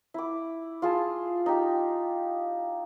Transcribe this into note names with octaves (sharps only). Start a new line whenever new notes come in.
E4 D6
F4 G#4 A5
D#4 G4